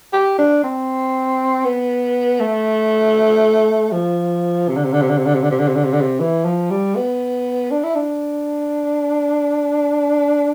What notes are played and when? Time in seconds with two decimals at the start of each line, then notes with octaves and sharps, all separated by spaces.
0.13 G4
0.38 D4
0.63 C4
1.65 B3
2.40 A3
3.92 F3
4.68 C3
4.76 D3
4.84 C3
4.93 D3
5.01 C3
5.09 D3
5.17 C3
5.26 D3
5.34 C3
5.43 D3
5.51 C3
5.59 D3
5.68 C3
5.76 D3
5.84 C3
5.93 D3
6.01 C3
6.20 E3
6.45 F3
6.70 G3
6.96 B3
7.71 D4
7.83 E4
7.95 D4